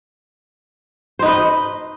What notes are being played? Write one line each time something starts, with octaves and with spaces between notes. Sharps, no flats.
D#4 B4 C5 D#5